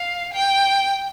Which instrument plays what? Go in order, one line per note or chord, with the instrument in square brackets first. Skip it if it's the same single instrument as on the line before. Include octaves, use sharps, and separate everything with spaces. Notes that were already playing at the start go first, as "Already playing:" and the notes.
Already playing: [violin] F5
G5